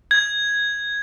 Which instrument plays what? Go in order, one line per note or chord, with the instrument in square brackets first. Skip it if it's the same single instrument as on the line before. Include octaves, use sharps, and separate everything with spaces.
[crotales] G#6